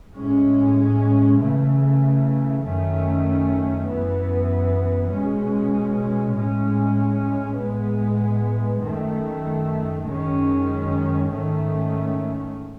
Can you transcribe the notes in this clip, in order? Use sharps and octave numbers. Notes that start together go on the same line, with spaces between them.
A2 G#3 C#4
C#3 E3 A3
F#2 D#3 A3 C#4
F#2 E3 B3
B2 G#3 C#4
A2 G#3 C#4
A2 G#3 B3
F#2 D#3 A3
F#2 D#3 G#3 C#4
G#2 D#3 A3 C#4